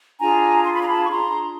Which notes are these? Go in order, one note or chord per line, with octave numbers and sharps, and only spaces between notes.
D4 F4 G#4 G#5 A#5
C6
B5
A#5
A5 B5
C#6
D4 F4 G#4 A#5 C6